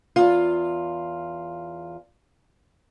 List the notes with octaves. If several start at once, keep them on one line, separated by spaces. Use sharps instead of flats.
E2 F4